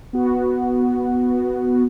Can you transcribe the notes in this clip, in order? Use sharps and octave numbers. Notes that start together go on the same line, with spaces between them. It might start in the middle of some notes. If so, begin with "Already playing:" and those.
B3 F#4